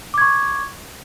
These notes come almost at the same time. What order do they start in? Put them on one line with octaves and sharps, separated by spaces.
D6 G#6 C#6